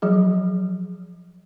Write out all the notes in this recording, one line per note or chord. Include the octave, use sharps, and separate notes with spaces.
F3 F#3 G#4